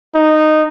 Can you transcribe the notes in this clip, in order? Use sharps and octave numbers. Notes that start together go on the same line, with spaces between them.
D#4